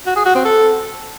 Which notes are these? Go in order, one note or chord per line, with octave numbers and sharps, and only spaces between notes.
F#4
G#4
F#4
C4
A4